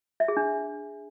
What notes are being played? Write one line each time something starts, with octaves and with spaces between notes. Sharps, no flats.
E5
G#4
D4